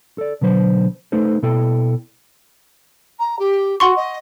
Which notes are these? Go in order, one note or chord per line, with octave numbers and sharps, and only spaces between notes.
A4 D5
B2 D3 F#3 B4 C5
A3 D#4 A4 B4 C5
B2 E4 A4 G5
A#5
G4
F#4 F#5 C6 C#6
D#5